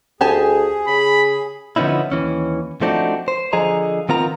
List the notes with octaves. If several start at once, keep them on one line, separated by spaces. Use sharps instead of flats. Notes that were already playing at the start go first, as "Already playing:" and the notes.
D2 G4 G#4 G#5 A5
C#3 B5
D3 F3 B3 C#4 D#4 E4
D#2 E3 C#4
F3 A3 C4 D4 D#4 F#4
C5
D3 F3 G#4 D#5 A#5
D#3 B3 C4 F4 A#4 A#5